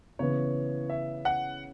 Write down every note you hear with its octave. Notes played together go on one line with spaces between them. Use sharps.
C#3 E3 B3 E4 C#5
E5
F#5